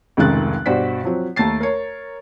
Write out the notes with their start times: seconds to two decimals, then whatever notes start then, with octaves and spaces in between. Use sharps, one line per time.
0.17 F1 C#2 D#3 G#3 F#6 A6
0.66 G2 B2 F#4 C5 D5 B6
1.03 F3 F#3 C4
1.36 D#2 A3 A5 A6 C7
1.60 A#4 C#5